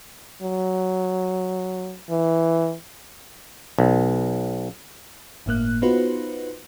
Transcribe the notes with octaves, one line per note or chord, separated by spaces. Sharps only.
F#3
E3
B1
G1 A2 A#3 F#6
B3 D#4 F4 F#4 B4 C5